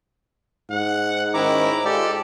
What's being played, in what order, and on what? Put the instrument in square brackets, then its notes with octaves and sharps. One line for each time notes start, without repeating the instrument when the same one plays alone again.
[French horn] G#2 [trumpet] F#5
[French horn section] D#3 C#4 D#4 [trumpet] E4 [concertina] A#5 D6
[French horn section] G#3 F4 [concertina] G4 D5 [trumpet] A4